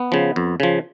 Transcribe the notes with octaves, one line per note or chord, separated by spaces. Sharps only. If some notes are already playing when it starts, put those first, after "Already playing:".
Already playing: B3
C#3 F3
F2
C#3 F3